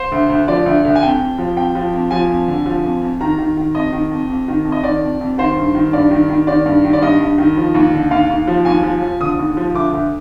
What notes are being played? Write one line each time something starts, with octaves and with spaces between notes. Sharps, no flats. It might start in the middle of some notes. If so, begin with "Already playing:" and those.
Already playing: C5
D2
D2
F3 D5
D2
D2
G#5
F2 G5
F2
F3
F2 G5
F3
F2
F3 G#5
F2
D3
F3
F2
F2
D#3 A#5
D#3
D#3
F2 D#5
D#3
F2
F2
D#3
F2
D#5
D#3 D5
F2
F2
D#3 C5
G2
D#3
G2 D5
D#3
D#3
D#3 D5
G2
D#3
D5
G2 D#5
G2
D#3
F3
D#2
D3
D#2 F5
D#2
F3
D#2 G#5
F3
F3
D3 D#6
D#2
F3
D2 D6
D2